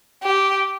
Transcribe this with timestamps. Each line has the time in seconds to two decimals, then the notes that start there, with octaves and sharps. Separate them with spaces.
0.23 G4